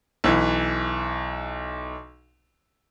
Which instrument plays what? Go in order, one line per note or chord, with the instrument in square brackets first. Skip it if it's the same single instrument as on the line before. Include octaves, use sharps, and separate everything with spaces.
[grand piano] B1 E3